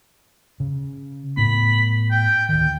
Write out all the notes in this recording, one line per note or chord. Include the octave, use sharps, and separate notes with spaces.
C#3
A2 B3 B5
G5
D2 D#3 G5